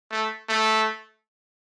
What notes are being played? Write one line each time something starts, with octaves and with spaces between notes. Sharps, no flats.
A3
A3